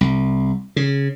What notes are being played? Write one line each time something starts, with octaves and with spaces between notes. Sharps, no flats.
C2
C#3